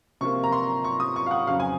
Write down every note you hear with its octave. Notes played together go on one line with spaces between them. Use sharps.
C3 F3 A#3 F4 C#6
A#5
C6
C#6
D#6
C#6
F5
F#5
F2 C#3 F#3 F5
G#5